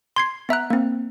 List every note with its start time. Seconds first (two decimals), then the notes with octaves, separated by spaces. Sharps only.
0.16 C6 G#6 C7
0.49 B3 E5 A#5 F#6
0.70 A#3 C4